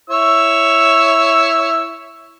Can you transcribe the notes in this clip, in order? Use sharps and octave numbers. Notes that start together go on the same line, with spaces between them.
E4 C#5 E6